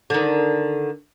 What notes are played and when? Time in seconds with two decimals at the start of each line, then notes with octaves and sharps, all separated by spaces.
0.10 D3 D#3